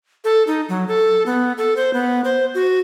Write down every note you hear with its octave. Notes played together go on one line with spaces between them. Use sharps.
A4
D#4
F#3
A4
B3
A4
C5
B3
C5
F#4